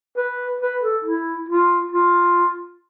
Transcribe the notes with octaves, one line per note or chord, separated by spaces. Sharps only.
B4
B4
A4
E4
F4
F4